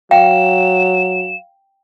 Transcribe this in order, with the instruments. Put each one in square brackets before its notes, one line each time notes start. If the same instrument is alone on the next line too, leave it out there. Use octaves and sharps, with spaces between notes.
[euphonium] F#3 [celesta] F5 [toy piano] G5 [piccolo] E7